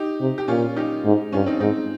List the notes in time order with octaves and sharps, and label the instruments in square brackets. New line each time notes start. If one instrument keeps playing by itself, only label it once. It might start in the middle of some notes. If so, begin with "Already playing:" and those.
Already playing: [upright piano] D#4 G4
[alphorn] C3
[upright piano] G4
[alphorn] A#2 [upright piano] C#4 F4
[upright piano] D#4 G4
[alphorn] G#2
[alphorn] G2 [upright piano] C#4 F4
[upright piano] C4 D#4
[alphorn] G#2 [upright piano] C4 D#4